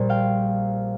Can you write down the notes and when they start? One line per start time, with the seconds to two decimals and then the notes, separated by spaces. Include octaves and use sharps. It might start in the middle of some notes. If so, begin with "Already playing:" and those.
Already playing: A#1 A#2 G3 A#3
0.09 F5 G5